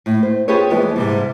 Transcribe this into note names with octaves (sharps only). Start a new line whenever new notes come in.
A2
C5
F4 G4 G#4 B4 C#5
F2 E3 G#3 B3
G#2 C3 G3